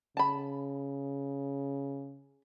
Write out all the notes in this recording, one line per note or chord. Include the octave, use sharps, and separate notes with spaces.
C#3 A5 B5